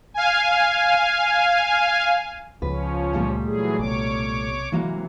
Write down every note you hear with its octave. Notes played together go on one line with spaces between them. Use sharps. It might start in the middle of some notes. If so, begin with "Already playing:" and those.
F5 G#5
C#2 F3 C#4 B4
A#2 G3 A3
E3 F#3 G#4
B1 C3 C#5 D6
C3 E3 F#3 G#3 A#3